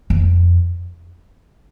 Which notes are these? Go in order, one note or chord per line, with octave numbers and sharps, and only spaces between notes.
F2